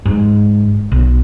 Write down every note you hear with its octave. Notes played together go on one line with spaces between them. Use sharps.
G#2
B1